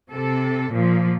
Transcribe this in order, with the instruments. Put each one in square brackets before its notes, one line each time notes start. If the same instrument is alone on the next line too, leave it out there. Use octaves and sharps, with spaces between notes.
[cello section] C3 A4
A#2 F3